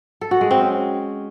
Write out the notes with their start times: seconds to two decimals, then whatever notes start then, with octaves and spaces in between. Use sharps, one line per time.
0.21 A4
0.31 F#4
0.41 G#3
0.51 C4
0.60 C#4